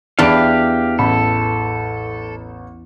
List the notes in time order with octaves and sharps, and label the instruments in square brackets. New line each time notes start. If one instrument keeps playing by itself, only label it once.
[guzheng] E2 E3 A5 [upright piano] D4 D7 [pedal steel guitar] G4 F5
[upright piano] A1 B5 [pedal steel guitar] A4